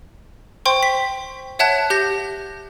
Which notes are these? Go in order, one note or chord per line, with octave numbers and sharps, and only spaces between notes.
C5 G5 C6 C#6
B6
C#5 E5 F#5 A5 F#6 G#6
G4 G6 A#6